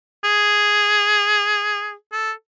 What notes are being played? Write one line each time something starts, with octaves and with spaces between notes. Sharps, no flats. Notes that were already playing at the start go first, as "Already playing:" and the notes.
G#4
A4